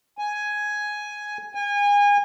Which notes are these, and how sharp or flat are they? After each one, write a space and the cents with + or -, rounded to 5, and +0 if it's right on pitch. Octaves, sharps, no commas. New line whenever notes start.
G#5 +5
G#5 -30